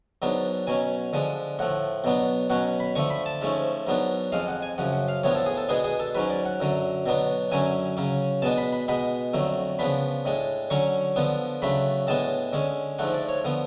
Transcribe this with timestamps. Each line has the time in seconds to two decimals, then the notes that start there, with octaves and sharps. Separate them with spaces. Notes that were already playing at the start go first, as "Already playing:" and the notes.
0.22 G#2 F#3 B3 D4
0.67 B2 F#3 C#4 G#5
1.13 D3 F3 G#3 D4
1.59 A2 F3 A3 F#5
2.04 B2 F#3 B3 D4
2.50 B2 F#3 C#4 F#5
2.80 B5
2.95 D3 F3 A3 C#6
3.10 B5
3.26 A5
3.41 G#2 F3 A3 C#4
3.87 G#2 F#3 B3 D4
4.32 F2 F3 G#3 F5
4.48 F#5
4.62 G#5
4.78 F#2 C#3 F3 F#5
4.93 F#5
5.08 F5
5.24 A2 F3 B3 D4 C#5
5.35 A4
5.46 G#4
5.57 A4
5.69 B2 G#3 B3 D4 G#4
5.84 G#4
6.00 A4
6.15 G#2 F#3 C#4 B4
6.30 D5
6.45 F#5
6.60 F#2 D3 F#3
7.06 B2 F#3 B3 D4
7.51 F#2 D3 F#3 C#4 G#5
7.97 C#3 F#3 C#4
8.42 B2 G#3 B3 D4 A5
8.58 B5
8.73 B5
8.88 B2 G#3 B3 B5
9.33 F2 D3 F#3 A3
9.79 C#3 F3 B3 D4 B5
10.25 A2 G#3 D4
10.70 D3 F#3 C#4 C#6
11.16 D3 F3 B3 D4
11.62 C#3 F#3 A3 D4 B5
12.07 A2 G#3 B3 D4 A5
12.53 D3 G#3 C#4
12.99 G#2 F3 A3 D4 F#5
13.14 D5
13.29 C#5
13.45 D3 F3 B3